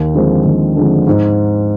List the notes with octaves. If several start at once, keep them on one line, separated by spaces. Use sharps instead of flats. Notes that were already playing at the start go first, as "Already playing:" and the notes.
Already playing: D#2
D3 F3 G#3 C4
D#2
D3 F3 G#3 C4
G#2